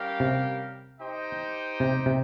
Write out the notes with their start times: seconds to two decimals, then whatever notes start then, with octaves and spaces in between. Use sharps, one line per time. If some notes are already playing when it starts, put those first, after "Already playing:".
Already playing: G3 C#4 G4 A#4 F5
0.20 C3
1.00 D#4 G4 C5 D#5 G5
1.80 C3
2.06 C3